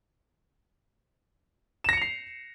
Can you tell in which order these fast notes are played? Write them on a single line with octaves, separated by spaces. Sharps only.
E7 A#6 C#7 F7 C7